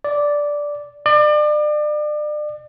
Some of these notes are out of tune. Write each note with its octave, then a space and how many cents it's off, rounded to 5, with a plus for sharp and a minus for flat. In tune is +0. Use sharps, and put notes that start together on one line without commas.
D5 -5
D5 +35